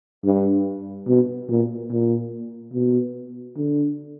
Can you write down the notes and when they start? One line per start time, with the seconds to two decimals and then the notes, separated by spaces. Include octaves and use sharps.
0.25 G2
1.08 B2
1.49 A#2
1.91 A#2
2.73 B2
3.57 D3